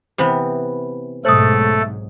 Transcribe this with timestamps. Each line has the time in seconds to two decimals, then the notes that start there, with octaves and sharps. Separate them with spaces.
0.18 C3 E3 B3
1.25 B1 G#2 A3 A4 C5 D#6